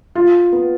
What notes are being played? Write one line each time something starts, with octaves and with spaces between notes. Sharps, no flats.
F4
B3